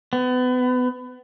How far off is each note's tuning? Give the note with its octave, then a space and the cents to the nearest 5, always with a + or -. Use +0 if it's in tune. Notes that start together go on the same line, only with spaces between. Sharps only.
B3 +30